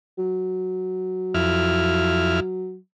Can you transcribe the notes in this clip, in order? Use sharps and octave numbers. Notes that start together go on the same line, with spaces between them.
F#3
F2 E4 F6